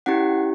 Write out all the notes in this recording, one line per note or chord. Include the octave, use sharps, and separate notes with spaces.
C#4 E4 G4 F#5